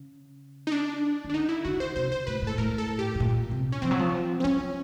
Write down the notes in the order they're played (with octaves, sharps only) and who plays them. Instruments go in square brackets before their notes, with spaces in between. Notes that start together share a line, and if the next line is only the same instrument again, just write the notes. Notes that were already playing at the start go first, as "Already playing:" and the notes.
Already playing: [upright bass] C#3
[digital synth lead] D#4
D4
[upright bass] D#3
[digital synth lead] D4
[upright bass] D3 [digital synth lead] D#4
[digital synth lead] E4
[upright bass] D3 [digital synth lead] F#4
[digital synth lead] C5
[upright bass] C3 [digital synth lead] C5
[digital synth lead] C5
[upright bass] A2 [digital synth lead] B4
[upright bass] A2
[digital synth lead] A4
[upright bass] A2 [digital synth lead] A#4
[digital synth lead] A4
G4
[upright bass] A2
A#2
C3
[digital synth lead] C#4
[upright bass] F3 [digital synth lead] C4
[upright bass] F#3
F3
[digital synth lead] C4
[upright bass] F#3 [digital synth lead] C#4